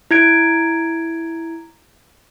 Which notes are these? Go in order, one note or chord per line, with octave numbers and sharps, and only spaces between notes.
E4 G#6 D7